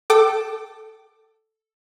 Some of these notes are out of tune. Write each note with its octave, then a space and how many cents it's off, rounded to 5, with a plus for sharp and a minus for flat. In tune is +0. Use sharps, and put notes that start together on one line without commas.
A4 +0 G5 -25 D6 +20